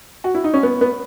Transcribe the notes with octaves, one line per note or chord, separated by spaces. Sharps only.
F#4
E4
D#4
C#4
B3
B3